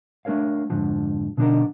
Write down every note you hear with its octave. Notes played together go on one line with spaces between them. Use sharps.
A3 D4 A#4 C#5 F5
F2 G#2 D3 F3
B2 D3 F3 D4 D#4 A#4